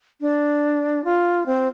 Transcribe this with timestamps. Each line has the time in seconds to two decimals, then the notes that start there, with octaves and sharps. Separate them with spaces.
0.21 D4
1.05 F4
1.46 C4